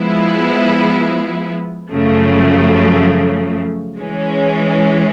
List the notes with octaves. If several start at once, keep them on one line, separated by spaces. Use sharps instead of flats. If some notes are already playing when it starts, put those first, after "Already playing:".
Already playing: F3 G#3 B3 E4
F#2 C#3 F3 A3
E3 G#3 C#4